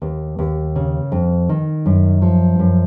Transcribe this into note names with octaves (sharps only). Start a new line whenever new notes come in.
D#2
D#2
C#3
F2
D#3
F#2
F3
F#2